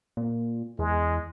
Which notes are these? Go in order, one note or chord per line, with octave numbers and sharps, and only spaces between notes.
A#2
E2 G#3